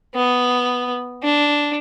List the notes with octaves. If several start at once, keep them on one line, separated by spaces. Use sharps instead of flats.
B3
D4